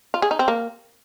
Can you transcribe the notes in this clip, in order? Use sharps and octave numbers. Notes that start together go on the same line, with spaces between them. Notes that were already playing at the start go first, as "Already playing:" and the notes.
F4
G#4
D#4
C4
A#3